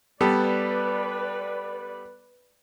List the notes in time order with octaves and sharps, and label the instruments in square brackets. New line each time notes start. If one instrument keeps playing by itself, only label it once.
[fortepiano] G3 B3 A4 [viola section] B4 D5